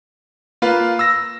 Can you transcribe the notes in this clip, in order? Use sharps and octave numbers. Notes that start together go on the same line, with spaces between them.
A#3 F4 B4 F5
E6 A#6